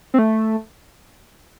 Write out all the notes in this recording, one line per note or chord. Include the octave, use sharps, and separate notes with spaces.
C4
A3